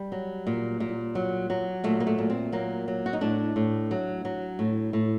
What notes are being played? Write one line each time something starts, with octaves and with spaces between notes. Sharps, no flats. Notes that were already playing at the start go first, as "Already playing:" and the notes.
Already playing: G3
F#3
A#2
A#2
F#3
F#3
A#2 A3
A#3
A3
A#2
C4
F#3 A#3
F#3
F#4
D#4
A2 D4
A2
F#3
F#3
A2
A2